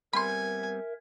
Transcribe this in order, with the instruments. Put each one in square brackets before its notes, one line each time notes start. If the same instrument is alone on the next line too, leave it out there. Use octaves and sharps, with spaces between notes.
[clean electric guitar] G3 B3 C4 [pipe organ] A#4 E5 [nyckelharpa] G#5 [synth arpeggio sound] B5 C6